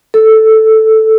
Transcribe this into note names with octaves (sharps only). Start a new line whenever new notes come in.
A4